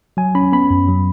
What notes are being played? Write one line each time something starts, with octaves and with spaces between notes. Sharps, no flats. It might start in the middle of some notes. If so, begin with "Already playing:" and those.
F#3 G#5
C#4 B5
B3 B5
F#2
F#3